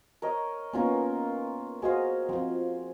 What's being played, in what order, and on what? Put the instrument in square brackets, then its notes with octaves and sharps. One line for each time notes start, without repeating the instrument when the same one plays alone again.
[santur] A#4 C#5 D#5
[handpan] A#3 B3 D#4 [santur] C#4 F4 A#4
[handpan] F#4 D#5 F5 [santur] G#4 C5
[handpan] F3 F4 [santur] C4